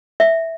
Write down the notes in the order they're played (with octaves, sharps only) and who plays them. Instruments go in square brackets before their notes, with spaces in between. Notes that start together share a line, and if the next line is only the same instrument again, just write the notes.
[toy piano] E5